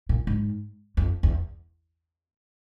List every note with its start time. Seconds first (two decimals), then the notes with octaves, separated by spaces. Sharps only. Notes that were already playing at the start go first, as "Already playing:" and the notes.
0.09 A#2
0.27 G#2
0.97 F2
1.23 E2